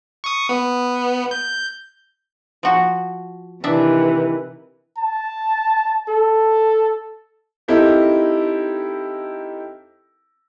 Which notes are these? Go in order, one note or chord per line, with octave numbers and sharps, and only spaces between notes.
C#6 D#6
B3
G6
F3 F#4
C3 D#3 E3 D4 E5
A5
A4
C4 D#4 E4 G4 A4 A#4